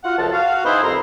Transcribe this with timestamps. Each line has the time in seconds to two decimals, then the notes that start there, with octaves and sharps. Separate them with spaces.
0.04 F4 F#4 F5 F#5
0.18 C#2 F#2 F3 A4 A5
0.32 F#4 F5
0.64 B3 D#4 E4 G#4 B4 C5
0.82 C2 F2 E4 A#5 C6